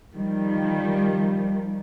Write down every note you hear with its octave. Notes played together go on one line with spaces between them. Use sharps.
D#3 F3 G3